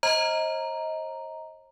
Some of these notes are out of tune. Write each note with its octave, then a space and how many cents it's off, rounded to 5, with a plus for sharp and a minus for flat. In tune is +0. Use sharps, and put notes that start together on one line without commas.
C5 +45 D#5 +25 A#5 +0